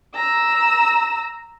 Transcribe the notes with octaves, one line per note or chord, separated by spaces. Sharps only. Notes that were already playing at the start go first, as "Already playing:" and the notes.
A#5 E6